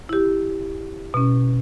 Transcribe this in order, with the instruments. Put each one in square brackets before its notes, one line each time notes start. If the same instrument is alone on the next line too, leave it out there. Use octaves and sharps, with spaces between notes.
[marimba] E4 G4
B2 C#4